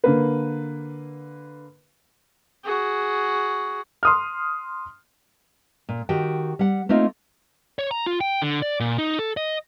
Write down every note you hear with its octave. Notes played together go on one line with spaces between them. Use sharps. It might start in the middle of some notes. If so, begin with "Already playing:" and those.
D3 A#3 B4
F#4 G#4
C6 D#6 F6
A#2
D#3 F#4 G4 G5
G3 F#5
A3 A#3 C4 D#4 F4
C#5
A#5
F4
G5
D3
D5
A#2
D#4
A4
D#5